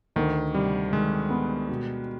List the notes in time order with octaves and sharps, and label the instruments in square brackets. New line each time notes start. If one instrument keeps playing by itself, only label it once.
[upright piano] D2 [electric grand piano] D#3
[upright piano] C3 [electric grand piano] G3
[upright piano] D#3 [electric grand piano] G#3
[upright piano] B3
B2